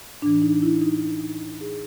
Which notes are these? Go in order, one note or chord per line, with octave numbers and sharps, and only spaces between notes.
A2 E3 D4
D#4
E4
D#4
G#4